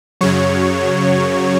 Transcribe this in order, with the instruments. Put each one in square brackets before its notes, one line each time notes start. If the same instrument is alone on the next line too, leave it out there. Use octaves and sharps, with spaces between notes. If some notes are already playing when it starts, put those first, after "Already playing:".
[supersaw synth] F#2 C#3 F#3 C#5